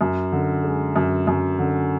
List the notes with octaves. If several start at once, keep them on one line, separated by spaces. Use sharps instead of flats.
F#2
D3
G#3
F#2
F#2
D3